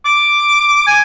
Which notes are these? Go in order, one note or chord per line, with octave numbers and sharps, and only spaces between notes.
D6
G#5